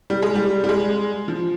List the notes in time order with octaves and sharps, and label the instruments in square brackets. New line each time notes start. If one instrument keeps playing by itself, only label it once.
[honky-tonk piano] G3
G#3
G3
G3
G#3
F3